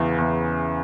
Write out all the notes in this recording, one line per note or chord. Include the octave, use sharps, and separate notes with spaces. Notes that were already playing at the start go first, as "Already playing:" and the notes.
Already playing: E2 C#3 E3
E2